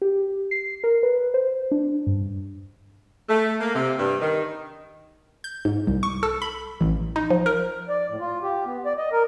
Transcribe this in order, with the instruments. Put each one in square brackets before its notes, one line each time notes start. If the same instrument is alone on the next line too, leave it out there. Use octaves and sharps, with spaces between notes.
[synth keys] G4
C7
A#4
B4
C5
D4
G2
[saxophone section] A3
A#3
C3
G2
D#3
[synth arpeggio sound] G6
G#2
C2
C#6
A4
B5
A1
D#4
F3
A#4
[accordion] D5
A2
F4
G4
B3
D5
D#5
A#4